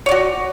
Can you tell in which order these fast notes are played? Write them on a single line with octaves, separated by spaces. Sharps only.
C#5 D5 F#4